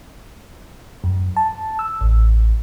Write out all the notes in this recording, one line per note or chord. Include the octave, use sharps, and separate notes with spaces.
F#2
A5
E6
A1